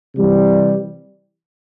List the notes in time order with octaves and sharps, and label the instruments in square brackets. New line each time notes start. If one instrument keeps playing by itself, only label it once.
[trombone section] C3 E3 G3